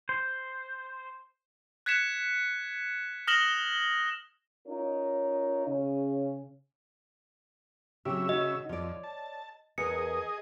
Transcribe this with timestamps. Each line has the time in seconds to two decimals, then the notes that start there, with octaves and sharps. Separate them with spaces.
0.09 C5
1.86 F#6 G#6 B6 C#7 E7
3.27 D#6 F6 A#6 E7 F#7 G7
4.68 C#4 D#4 F4 A#4 C#5
5.67 C#3 C#4
8.05 C#3 F#3 C4 G4 E5
8.29 D#4 F#4 D#5
8.69 F2 C#5 D5
9.04 A5
9.78 E2 G#4 A#4 D#5 C#7